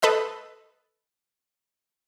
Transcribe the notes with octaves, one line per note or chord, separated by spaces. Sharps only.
A4 B4 D#5 E6